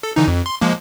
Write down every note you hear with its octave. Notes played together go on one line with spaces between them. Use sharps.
A4
D3 E3 D#4
F2
C6
F3 G#3 A#3